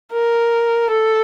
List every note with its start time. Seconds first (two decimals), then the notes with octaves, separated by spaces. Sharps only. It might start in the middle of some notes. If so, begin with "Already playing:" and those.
0.12 A#4
0.90 A4